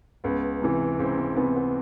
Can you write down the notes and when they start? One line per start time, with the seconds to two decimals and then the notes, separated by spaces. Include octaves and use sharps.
0.24 C#2 B3
0.62 C3 E3
0.99 C#2 C4
1.18 C4
1.37 C3 E3 B3
1.56 B3